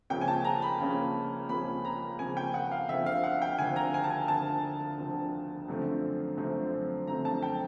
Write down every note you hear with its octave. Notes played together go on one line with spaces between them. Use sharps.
C#2 C#3 F3 A#3 C#4 G5
G#5
A5
A#5
B5
C#2 C#3 F3 A#3 C#4
C#2 C#3 F3 A#3 C#4 B5
A#5
C#2 C#3 F3 A#3 C#4 G#5
G5
F#5
F5
D2 D3 F3 E5
F5
F#5
G5
D2 D3 F3 G#5
A#5
G#5
A5
G#5
D2 D3 F3 A5
D2 D3 F3
F#2 D3 F3 A3 C4
F#2 D3 F3 A3 C4
F#2 D3 F3 A3 C4 A#5
A5
G5